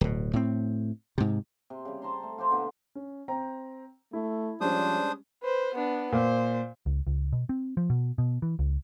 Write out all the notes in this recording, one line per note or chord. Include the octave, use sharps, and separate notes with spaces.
D1 B2
A2 C4
G#2 C3
C3
C#3 G3
C5 A5 A#5 C6
A3
F4 G4 C5 A#5
B2 D3 G4
C#4
C4 G5 A#5
A3 E4
F3 G3 G#3 C#4 D4 C5 D#6
B4 C5
B3 D4
A#2 C5
C#2
C#2
B2
C4
F3
B2
B2
E3
C#2